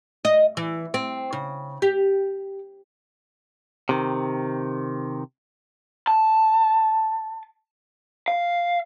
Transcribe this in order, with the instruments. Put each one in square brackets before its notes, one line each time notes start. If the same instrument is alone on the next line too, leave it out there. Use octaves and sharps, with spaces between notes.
[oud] D#5
E3
C4
C#3
G4
[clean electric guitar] C3 D#3
[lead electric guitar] A5
F5